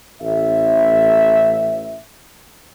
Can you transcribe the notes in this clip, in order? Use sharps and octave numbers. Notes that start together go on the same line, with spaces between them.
A1 E5